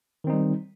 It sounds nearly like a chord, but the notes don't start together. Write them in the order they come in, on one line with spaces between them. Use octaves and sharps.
D#3 C4 D#4 G3